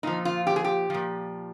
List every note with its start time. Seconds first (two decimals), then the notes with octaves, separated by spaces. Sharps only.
0.03 A#2 F3 D#4
0.25 F4
0.47 G4
0.56 G#4
0.64 G4
0.90 A#2 F3